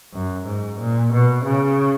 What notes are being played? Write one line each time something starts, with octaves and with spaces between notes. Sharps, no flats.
F#2
G#2
A#2
B2
C#3